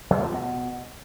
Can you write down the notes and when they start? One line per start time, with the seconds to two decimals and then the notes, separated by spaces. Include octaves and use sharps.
0.10 E2
0.22 F3
0.33 B2